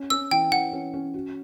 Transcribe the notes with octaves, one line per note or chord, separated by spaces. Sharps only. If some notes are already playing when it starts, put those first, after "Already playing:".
Already playing: C#4
C#4 E6
E3 G5
E3 F#5
C#4
C#4
F#4